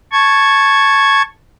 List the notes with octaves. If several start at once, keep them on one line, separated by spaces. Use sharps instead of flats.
A5 C#6 G#6